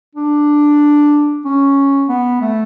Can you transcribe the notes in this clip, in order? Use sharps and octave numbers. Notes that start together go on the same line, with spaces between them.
D4
C#4
B3
A3